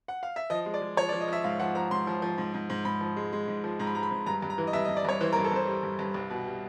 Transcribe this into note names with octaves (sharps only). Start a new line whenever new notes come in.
F#5
F5
E5
F3 D#5
G#3
D5
G#3
F3 C#5
D5
F3
D#5
F3 E5
G#2 F5
F3 F#5
F3 A#5
G#2 C6
F3
F3
G#2
G#2
G#2
G#2 B5
F3
G#3
G#3
G#2
F3
G#2 A#5
B5
G#3 A#5
B5
G#2
G2 A#5
G2
A#5
E3
D#5
G2 E5
D#5
G2
D5
G2 C#5
E3 C5
A#4
G2
A4
G2 C5
G3
G2
G2
C2
B2
G3